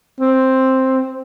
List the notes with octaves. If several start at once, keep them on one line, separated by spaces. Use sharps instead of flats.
C4